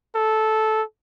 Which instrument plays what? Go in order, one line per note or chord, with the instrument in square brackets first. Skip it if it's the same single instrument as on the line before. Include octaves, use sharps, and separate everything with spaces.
[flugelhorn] A4